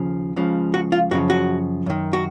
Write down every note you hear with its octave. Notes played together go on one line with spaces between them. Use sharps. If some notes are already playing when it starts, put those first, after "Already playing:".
Already playing: D#2 C#3 F3
C#2 C#3 F3
F#4
F4
F#2 C#3 F3 F#4
F#4
F#2 D#3
F#4